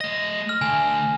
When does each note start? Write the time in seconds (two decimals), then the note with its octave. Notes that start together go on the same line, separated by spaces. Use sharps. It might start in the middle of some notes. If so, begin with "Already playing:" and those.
0.01 A3 D#5 A#6
0.49 F6
0.61 D3 A3 G#5